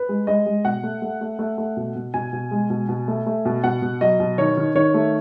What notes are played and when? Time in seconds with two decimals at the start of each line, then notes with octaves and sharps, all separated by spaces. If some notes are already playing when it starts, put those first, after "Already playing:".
Already playing: B4
0.09 G#3
0.27 G#3 D#5
0.46 G#3
0.65 B2 F#5
0.83 A3
1.02 A3
1.21 A3
1.39 A3
1.58 A3
1.77 B2
1.96 B2
2.14 B2 G#5
2.33 B2
2.51 G#3
2.70 B2
2.89 B2
3.08 A3
3.26 A3
3.45 B2
3.64 B2 F#5
3.82 B2
4.01 F#3 D#5
4.20 B2
4.38 D#3 C#5
4.57 D#3
4.75 D#3 C#5
4.94 A3